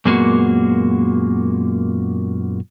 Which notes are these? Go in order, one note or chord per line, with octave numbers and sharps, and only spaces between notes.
F#2 A#2 G#3 A#3 B3 F#4